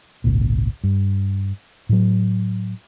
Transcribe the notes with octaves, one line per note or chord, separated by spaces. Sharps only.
G#1 C#2 A#2
G2
A2 F#3